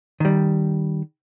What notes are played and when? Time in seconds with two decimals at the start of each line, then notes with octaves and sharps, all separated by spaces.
0.20 D#3 G3